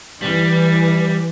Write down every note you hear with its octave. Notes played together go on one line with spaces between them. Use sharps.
E3 G3